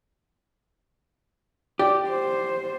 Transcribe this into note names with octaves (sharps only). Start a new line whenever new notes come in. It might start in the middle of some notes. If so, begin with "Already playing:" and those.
G4 D5
C5